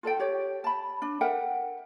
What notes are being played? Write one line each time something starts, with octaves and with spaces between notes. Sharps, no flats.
F4 A4 D5 G5
G4 C#5
A5 B5
D4
A#4 E5 F#5 G5